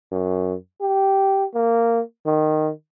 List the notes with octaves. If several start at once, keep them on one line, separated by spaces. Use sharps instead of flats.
F#2
G4
A#3
D#3